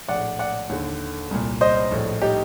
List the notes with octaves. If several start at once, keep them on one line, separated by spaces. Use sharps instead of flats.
A#1 A2 D5 F#5
D5 F#5
D#2 D3
C2 A#2
C5 D#5
A#1 A2
D#4 G4